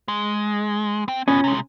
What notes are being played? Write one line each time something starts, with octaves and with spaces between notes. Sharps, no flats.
G#3
C4 G5
B3 C#4 F4
C3 G#3